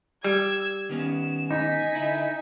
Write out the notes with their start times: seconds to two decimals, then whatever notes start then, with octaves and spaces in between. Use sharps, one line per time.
0.24 G3 E6 G#6
0.89 D#3 B3 C#4 E7
1.51 D#4 G#5 B6
1.95 D3 E4